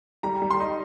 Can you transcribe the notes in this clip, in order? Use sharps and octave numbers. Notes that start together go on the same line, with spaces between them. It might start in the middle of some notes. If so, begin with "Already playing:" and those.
G3 A#5
G3
C6
D#4